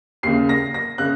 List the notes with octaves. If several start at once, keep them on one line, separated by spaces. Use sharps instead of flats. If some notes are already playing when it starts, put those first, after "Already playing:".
D#2 C#3 C7
A#6
A#6
C#3 F#6